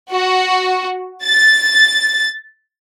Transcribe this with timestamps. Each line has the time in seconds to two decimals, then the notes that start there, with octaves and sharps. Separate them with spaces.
0.11 F#4
1.25 A6